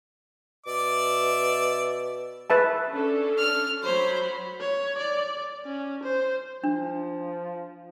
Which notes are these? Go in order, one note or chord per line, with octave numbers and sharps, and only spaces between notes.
B2 D5 E5 D6
G#4 B4 E5 A5
C#4 D4 A4
F6
F#3 C5 C#5 B5
C#5
D5
C#4
C5
F3 D4